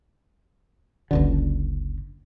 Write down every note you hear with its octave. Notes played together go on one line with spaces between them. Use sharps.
F#1 C#2 D3